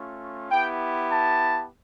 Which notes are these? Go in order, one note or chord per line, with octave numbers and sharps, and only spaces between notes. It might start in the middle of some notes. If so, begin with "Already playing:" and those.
Already playing: A3 C#4 F4
B3 E4 G4 G5
A5